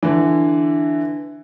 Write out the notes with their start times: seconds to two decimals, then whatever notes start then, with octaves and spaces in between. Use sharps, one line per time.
0.03 D3 E3